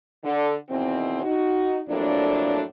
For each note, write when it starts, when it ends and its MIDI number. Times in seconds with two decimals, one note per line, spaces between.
0.24 0.53 50
0.69 1.23 40
0.69 1.23 47
0.69 1.23 51
0.69 1.23 60
1.23 1.80 63
1.23 1.80 66
1.88 2.62 41
1.88 2.62 45
1.88 2.62 54
1.88 2.62 58
1.88 2.62 62